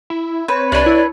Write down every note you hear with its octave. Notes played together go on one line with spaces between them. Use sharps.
E4
C4 B4 C#5
C2 D4 B4 D5
E4